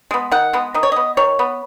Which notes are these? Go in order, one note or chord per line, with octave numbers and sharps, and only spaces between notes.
G#3 B3
D#3 F#5
G#3 B3
D#3 D#5
C#5
B3 D#5
D#3 C#5
B3